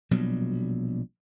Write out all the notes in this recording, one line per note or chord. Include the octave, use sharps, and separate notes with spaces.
A#1 B2 F#3 G3